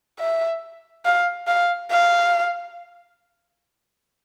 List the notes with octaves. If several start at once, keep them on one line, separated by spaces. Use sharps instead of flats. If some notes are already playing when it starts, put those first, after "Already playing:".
E5
F5
F5
F5